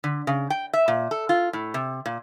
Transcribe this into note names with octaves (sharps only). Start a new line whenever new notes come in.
D3
C#3
G5
E5
A#2
A4
F4
A2
C3
A#2